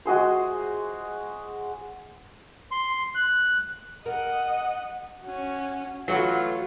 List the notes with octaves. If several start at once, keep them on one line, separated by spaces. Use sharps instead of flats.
G#3 F#4 G#4 C5
C6
F#6
A#4 D#5 F#5
C#4 F#4
E3 F#3 A3 F4 F#4